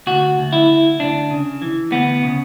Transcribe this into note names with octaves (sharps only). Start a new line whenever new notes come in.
D2 F#4
D2
E4
D2
D2 D4
C#3
E3
D2 B3
C#3